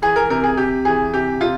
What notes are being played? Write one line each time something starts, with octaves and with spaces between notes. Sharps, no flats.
E3 G#4
A#4
C3 A#4
G#4
C3 G4
E3 G#4
C3 G4
C3 F4